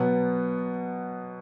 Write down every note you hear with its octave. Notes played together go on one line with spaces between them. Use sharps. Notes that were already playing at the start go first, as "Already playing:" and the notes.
Already playing: B2 F#3 B3